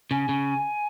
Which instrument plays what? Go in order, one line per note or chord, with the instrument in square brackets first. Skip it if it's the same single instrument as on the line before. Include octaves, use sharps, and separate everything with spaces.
[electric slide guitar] C#3 [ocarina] G#5
[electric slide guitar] C#3